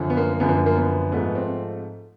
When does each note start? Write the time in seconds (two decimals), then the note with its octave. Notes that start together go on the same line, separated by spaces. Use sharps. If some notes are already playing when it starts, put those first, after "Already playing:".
Already playing: F#2 D3 F3
0.10 B3
0.17 A#3
0.40 F#2 D3 F3 B3
0.49 A#3
0.66 A#3
0.76 B3
1.12 G#2 F3 A3 B3
1.35 C4